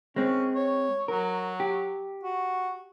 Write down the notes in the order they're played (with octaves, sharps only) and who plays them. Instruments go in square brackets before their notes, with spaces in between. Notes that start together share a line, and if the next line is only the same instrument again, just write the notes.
[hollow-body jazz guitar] G#3 C4 [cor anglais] C#4
[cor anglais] C#5
[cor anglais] F#3 [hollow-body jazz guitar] A#4
[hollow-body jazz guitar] G4
[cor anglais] F#4